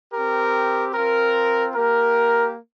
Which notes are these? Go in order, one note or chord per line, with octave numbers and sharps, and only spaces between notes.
C4 G4 A#4
C4 F4 A#4
A#3 G4 A#4